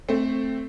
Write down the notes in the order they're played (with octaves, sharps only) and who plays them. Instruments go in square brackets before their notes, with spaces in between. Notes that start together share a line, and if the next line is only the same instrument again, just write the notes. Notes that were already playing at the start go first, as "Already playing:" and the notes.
[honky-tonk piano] A3 C4